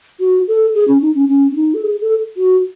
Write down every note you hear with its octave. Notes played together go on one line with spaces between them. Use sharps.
F#4
A4
G#4
C#4
D#4
C#4
C#4
C#4
D#4
A4
G#4
A4
F#4